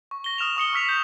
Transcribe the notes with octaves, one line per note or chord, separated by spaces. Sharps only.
C#6
A#6 G7
D#6 F6 E7 F7
C#6 D#6 C#7 G7
C#6 E6 F6 B6 C#7 F7
G6